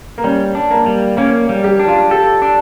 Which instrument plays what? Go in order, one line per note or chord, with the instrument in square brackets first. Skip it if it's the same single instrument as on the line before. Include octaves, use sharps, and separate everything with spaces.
[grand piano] A#3
[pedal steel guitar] G3 [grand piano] C#4
[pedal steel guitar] D4
[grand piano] A#3
[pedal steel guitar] G3
[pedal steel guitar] A#3 [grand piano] C#4
[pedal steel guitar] G3
[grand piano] G4
[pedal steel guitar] D4
[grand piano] F4
[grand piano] G4 [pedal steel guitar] A4
[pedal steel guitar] D4